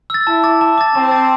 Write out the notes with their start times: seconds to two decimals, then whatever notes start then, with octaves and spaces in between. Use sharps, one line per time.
0.10 E6 A6
0.27 E4 A5
0.44 D6 A6
0.61 A5
0.78 D6 A6
0.95 C4 A5
1.11 D6 A6